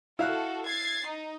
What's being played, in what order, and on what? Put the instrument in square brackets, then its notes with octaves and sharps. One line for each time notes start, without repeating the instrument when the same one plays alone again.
[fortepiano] E4 F5 F#6 [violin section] F#4 A4
[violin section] G#6 A6 C7
D#4